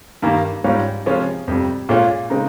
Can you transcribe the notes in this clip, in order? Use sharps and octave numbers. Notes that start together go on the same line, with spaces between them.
G2 D#3 A#3
G#2 G3 C#4 F4
C3 F3 G#3 C#4 F4
F2 C3 G3
A#2 G#3 C#4 F4
C#3 G#3 C4 D#4